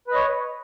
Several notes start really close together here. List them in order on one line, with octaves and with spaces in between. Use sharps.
B4 D#5 C#5